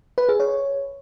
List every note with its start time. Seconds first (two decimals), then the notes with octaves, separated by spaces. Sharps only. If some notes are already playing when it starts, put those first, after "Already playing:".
0.18 B4
0.29 G#4
0.40 C#5